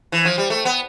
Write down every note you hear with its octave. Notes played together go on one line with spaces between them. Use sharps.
E3
F3
G3
A3
B3